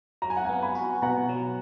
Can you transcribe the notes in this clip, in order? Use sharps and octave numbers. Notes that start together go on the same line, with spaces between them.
F#3 A#5
G#5
F#5
B3 F5 G#5
G#5 B5
F#4
B2 F#5 A#5
F#3